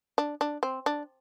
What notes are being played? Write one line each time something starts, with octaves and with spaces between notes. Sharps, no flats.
D4
D4
C4
D4